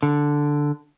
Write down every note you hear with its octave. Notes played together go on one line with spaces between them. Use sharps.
D3